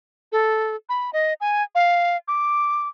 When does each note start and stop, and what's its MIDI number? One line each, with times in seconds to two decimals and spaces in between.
0.32 0.76 69
0.89 1.11 83
1.13 1.34 75
1.41 1.63 80
1.75 2.17 77
2.28 2.88 86